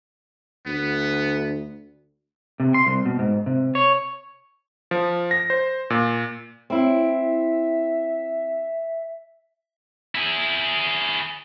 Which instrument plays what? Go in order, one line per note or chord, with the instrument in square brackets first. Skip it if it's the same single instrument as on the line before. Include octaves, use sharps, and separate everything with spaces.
[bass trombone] D2 [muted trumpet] B3
[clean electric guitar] C3
C6
C2
B2
G#2
C3
C#5
[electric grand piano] F3
A#6
C5
A#2
[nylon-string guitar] C4 E4 [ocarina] E5
[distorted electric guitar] E4 G#4